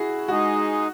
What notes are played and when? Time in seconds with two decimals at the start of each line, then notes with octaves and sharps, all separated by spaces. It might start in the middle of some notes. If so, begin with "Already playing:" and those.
Already playing: E4 F#4 G#4
0.28 G#3 D#4 F#4 G#4 D#5